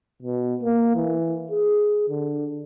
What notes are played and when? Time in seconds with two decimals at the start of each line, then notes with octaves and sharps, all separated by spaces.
0.22 B2
0.63 A#3
0.96 E3
1.51 G#4
2.09 D3